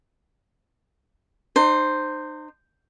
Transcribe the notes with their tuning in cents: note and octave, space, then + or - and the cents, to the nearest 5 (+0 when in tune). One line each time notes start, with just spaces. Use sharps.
D#4 -35 C5 +0